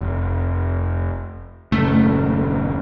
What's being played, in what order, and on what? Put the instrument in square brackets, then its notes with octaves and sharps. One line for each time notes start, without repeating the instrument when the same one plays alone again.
[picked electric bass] F1
[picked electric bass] D#1 F#2 C#3 [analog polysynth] A3